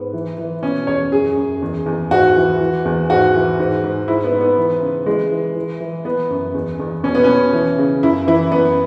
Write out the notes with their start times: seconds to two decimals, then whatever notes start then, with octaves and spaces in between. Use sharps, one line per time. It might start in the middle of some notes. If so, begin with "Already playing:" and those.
Already playing: G#2 B3
0.13 E3
0.38 E3
0.63 B2 C#4
0.87 E2 C#5
1.12 F#2 G#4
1.37 F#2
1.62 E2
1.86 E2
2.11 G#2 F#4
2.36 E3
2.60 E3
2.85 E2
3.09 G#2 F#4
3.35 E3
3.59 G#2
3.84 G#2
4.08 G#2 E4
4.24 B3
4.32 G#2
4.41 B3
4.57 E3
4.82 C#3
5.06 E3 G#3
5.32 E3
5.56 E3
5.80 E3
6.05 E3 B3
6.30 F#2
6.54 E2
6.80 E2
7.04 B2 C#4
7.15 B3
7.24 B2 C#4
7.53 E3
7.78 C#3
8.03 F#2 E4
8.27 E3 E4
8.52 F#2 B3